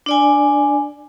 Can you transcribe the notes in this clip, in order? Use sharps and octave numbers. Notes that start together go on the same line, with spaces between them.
D4 D5 G#5